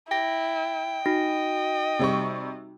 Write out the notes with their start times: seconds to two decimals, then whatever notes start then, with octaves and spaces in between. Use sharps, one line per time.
0.11 E4 G5 A#6
1.06 D#4 F#4 D#5 A#6
1.99 C3 G3 C#6